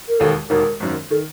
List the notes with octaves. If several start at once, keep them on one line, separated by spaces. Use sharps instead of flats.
A#4
E1 D#2 D#3 A4
E1 D#2 D#3 A#4
G#1 F#2 D#3
D#3 A4